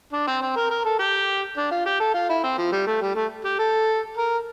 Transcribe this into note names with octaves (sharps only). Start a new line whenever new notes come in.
D4
C4
C4
A#4
A#4
A4
G4
D4
F4
G4
A4
F4
E4
C4
F3
G3
A3
G3
A3
G4
A4
A#4